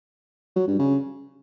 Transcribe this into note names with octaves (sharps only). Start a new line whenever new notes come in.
F#3
G2
C#3